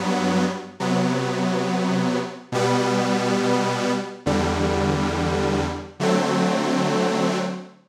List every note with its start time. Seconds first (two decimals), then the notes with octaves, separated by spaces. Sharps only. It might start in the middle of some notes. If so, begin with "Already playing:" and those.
Already playing: G2 F#3 B3
0.80 C3 F#3 B3
2.52 B2 G3 B3
4.26 E2 D3 G3
6.00 D3 F#3 A3 C4